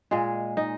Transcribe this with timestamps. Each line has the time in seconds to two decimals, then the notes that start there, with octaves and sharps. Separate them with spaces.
0.11 A#2 G#3 G#4
0.57 D#4